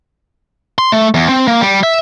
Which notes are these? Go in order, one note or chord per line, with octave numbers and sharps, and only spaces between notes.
C6
A3
E2
C4
A#3
G3
E5